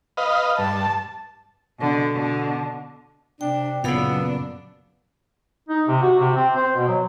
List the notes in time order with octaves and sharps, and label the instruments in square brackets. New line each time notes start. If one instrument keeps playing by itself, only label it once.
[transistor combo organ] B4 D#5 F5
[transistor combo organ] G2 [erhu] A5
[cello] B2 D3
B2 D3
[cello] C3 [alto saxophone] D4 [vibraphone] G5
[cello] F#2 D4 [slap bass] A#2 C#3 [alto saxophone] B3 [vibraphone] F5 B5 E6
[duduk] D#4
C3
F#4
C3
C4
C5
B2
F#3